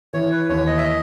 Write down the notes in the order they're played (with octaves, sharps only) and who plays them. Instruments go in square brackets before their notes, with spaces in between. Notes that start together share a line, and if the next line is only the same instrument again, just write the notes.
[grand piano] E3 [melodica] C#5
[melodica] B4
[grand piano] D#2 [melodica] C#5
[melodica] D#5
E5
D#5